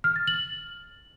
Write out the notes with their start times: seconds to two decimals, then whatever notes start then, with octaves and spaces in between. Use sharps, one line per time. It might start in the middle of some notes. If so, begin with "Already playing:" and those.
0.04 F6
0.16 A6
0.27 F#7